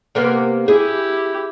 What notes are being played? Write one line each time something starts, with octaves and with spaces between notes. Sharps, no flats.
C3 A#3 B3
E4 G4 G#4